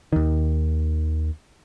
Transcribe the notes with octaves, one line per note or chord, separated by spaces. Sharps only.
D#2 D#3